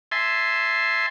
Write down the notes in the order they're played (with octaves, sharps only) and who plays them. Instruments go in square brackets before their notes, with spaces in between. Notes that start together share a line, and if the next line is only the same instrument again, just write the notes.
[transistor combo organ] E5 G#5 A5 C6